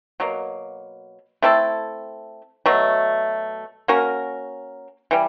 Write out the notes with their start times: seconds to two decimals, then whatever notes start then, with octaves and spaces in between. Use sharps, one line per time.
0.20 B2 F#3 A#3
1.42 A3 C4 E4 A4
2.66 B2 F#3 A3
3.88 A#3 C#4 F#4 A#4
5.11 E3 G3